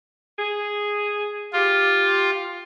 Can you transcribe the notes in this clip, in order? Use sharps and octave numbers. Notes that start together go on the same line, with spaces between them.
G#4
F4 G4